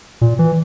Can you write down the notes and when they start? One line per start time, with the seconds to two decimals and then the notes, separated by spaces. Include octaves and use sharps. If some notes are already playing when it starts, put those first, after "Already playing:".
0.21 A#2
0.39 E3